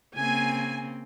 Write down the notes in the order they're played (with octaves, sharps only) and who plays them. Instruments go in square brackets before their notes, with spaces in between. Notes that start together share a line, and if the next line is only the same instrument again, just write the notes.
[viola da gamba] C#3 A#3 C4 [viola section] G#5